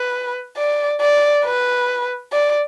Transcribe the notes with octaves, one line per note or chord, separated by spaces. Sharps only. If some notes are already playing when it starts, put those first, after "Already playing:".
Already playing: B4
D5
D5
B4
D5